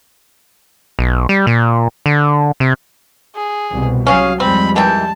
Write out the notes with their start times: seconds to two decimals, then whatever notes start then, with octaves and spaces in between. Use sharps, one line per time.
0.99 B1
1.29 G3
1.47 A#2
2.06 D3
2.60 C3
3.36 G#4
3.72 C2 B2
4.07 F#3 C#4 G#4 F5
4.40 F2 G3 G#3 C4 B5
4.76 D#3 E3 G5 A5